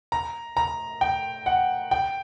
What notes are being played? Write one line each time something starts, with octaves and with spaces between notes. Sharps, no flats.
A#5
A#5
G5
F#5
G5